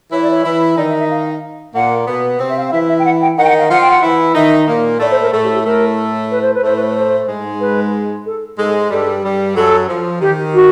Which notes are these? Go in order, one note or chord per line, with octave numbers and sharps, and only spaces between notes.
E3 E4 C#5
D5
C#5
E3 E4
D#3 D#4 D5
E5
E5
F5
A#2 A#3 F#5
B2 B3
C3 C4
E5
F5
F5
E3 E4 E5
E5
G5
F#5
G5
D#3 D#4 F#5
G5
F#5
F5
F3 F4 F#5
G5
F#5
E3 E4
D#3 D#4 E5
A#2 A#3
A2 A3 D5
C5
A#4
A2 A3 A4
G4
G4
A2 A3 A#4
B4
C5
B4
A2 A3 C5
B4
B4
C5
G#2 G#3
B4
A4
G#2 G#3 A4
G2 G3 A4
G2 G3
F#2 F#3 A4
F3
D#3 G4
F#4